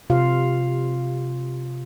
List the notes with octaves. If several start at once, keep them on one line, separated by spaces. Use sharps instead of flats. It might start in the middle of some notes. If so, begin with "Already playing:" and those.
C3 F4 F5